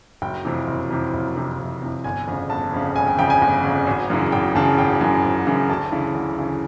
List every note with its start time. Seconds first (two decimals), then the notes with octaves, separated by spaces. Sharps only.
0.22 F#1 G5
0.45 F2 C3 E3
0.68 F#1
0.90 F2 C3 E3
1.14 F#1
1.36 F2 C3 E3
1.59 F#1
1.82 F2 C3 E3
2.04 G1 G#5
2.27 F2 C#3
2.50 G1 A5
2.73 F2 C#3
2.96 G1 G#5
3.07 G5
3.18 F2 C#3 G5
3.30 G#5
3.41 G1
3.64 F2 C#3
3.87 G#1
4.10 F#2 C#3 E3
4.32 G#1 G5
4.55 F#2 C#3 E3 A5
4.78 G#1 G5
5.01 F#2 C#3 E3
5.24 G#1
5.47 F#2 C#3 E3
5.70 D2 A5
5.92 C#3 E3
6.15 D2
6.38 C#3 E3